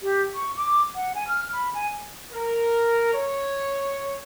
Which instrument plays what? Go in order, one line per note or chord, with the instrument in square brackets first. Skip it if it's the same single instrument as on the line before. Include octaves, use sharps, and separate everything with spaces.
[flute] G4
C#6
D6
F#5
G#5
F6
B5
G#5
[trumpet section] A#4
C#5